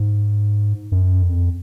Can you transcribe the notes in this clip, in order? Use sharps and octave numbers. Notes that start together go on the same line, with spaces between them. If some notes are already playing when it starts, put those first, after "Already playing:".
Already playing: G#2
F#2
F2